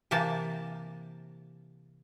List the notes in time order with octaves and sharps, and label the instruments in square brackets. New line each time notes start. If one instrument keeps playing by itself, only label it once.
[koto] C3 E3 A#3 G4 A5